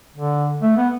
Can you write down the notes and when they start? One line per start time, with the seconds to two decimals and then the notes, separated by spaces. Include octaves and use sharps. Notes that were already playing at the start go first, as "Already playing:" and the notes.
0.16 D3
0.63 A3
0.77 B3